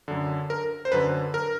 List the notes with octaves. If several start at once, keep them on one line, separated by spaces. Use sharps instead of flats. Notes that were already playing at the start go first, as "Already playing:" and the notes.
F#2 D3
A#4
C5
F#2 D3 B4
A#4